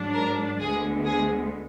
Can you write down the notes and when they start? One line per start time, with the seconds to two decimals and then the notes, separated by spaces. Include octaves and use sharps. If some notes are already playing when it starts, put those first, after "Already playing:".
Already playing: G#2 F#3 D4
0.13 A#4
0.59 D2 D3 G#3 B3 G#4
1.05 G#4